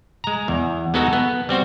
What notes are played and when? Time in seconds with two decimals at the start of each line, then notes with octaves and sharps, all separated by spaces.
0.24 G#3 A#5
0.48 E2
0.94 G#3 B3 D#4 F#4 A4
1.13 B3
1.49 G3 C4 F#4 C5